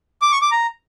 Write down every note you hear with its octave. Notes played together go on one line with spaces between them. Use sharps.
D6
C#6
D6
A#5